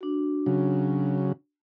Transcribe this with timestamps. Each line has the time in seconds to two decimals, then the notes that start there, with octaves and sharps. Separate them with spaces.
0.01 D4 F#4
0.46 C#3 F#3